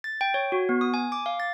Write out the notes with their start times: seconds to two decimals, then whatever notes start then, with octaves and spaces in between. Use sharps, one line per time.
0.04 A6
0.21 G5
0.34 C#5
0.52 F#4
0.69 B3
0.81 D#6
0.94 G#5
1.12 D6
1.26 F5
1.40 A6